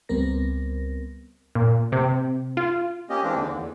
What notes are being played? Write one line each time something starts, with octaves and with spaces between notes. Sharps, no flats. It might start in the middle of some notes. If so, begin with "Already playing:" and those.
C#2 G3 B3 C4 A#4 A#6
A#2
C3
F4
A#3 C#4 G4 D#5
E3 G#3 A#3 C4 D4
D#2 D3
E2